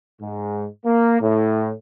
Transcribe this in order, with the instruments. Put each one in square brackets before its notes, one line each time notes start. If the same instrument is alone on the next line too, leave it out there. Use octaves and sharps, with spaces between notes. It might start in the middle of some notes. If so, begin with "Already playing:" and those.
[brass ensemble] G#2
A#3
A2